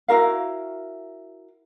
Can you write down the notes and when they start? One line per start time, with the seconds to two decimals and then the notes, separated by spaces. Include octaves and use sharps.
0.08 E4 F#4 A#4 F5